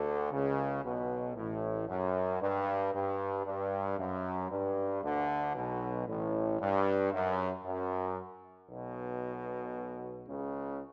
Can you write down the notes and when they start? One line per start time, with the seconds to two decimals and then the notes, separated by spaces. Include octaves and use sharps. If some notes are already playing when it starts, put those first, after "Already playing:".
Already playing: D2 D3
0.32 C#2 C#3
0.83 B1 B2
1.36 A1 A2
1.89 F#2
2.41 G2
2.93 G2
3.45 G2
3.98 F#2
4.50 G2
5.03 D2 D3
5.55 B1 B2
6.07 A1 A2
6.60 G2
7.12 F#2
7.65 F#2
8.69 B1 B2
10.27 C#2 C#3